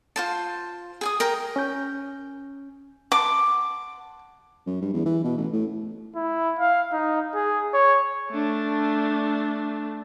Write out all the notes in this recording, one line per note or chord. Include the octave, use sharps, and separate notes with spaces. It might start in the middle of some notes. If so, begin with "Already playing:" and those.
F4 C5 A5
G#4 G#5 D#6
A#4 G5 A#5
C#4 G6
F#5 A5 C6 D6
F#2
G2
E2
E3
B2
A1
A2
E4
F5
D#4
G#4
C#5
A3 D4